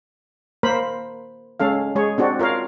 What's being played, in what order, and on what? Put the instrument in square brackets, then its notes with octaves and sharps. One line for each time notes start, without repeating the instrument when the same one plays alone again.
[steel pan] A#3 A#4 C5 B5
G#3 C#4 A4 F5
G#3 G#4 C#5
C4 D4 F#4 D5
F4 A#4 C#5 F5